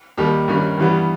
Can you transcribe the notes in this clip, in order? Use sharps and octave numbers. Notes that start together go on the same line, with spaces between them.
D#2 D#3 G3 G4
G2 D#3 G3 C#4
G2 E3 G3 B3